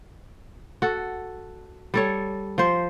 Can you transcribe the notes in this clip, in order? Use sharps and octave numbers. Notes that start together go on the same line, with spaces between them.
F#4 A4
G3 A4 C#5
F3 C5